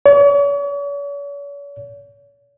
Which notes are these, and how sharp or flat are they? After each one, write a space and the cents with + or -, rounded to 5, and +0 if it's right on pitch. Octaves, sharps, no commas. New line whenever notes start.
C#5 +45